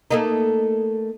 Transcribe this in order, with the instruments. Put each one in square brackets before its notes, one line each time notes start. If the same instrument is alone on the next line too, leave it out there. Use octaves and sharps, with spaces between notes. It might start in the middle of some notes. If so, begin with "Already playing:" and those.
[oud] A3 A#3 D#4